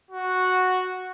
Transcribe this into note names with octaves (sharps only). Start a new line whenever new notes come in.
F#4